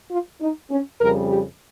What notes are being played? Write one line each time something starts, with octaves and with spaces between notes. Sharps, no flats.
F4
D#4
C#4
F2 C#3 G3 A#4
G4